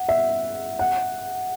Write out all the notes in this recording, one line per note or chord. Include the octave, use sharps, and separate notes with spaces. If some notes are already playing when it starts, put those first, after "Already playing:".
Already playing: F#5
E5
F#5